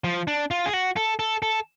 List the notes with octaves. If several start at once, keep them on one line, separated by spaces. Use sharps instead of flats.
F3
D4
F4
G#4
F#4
A4
A4
A4